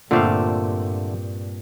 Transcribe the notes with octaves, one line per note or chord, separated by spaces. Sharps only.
G2 A#2 D3 A3 C4 F5